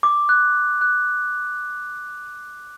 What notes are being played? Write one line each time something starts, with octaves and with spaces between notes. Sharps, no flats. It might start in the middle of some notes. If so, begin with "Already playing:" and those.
D6
F#6
F#6